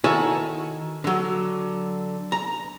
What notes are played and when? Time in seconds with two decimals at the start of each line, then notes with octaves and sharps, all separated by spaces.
0.04 D#3 E4 F#4 A4 C#5 G#5
1.04 D3 F#3
2.32 A#5